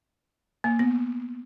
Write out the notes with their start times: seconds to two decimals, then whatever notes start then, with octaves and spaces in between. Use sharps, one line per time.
0.64 A#3
0.79 B3